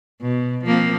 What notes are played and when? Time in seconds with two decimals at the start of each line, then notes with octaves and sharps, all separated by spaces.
0.22 B2
0.65 F3 A#3 C4